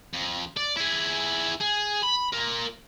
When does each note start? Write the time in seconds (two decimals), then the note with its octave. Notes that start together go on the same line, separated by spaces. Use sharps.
0.13 F2
0.57 D5
0.77 E4 G#4
1.60 G#4
2.03 B5
2.32 F4 A#4